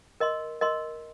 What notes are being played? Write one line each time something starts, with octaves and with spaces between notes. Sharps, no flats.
A#4 D#5 C6
A#4 D#5 C6